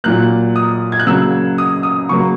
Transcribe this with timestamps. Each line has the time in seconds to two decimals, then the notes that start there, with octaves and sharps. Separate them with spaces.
0.04 A#2 F#3 A#3 F#6
0.56 D#6
0.92 G#6
0.99 F#6
1.07 C#3 F#3 A#3 E6
1.58 D#6
1.83 D#6
2.09 C#3 F#3 A#3 C#6